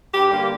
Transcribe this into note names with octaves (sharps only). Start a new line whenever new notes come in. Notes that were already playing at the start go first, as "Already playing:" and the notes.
G2 G4
D3 G3 A#3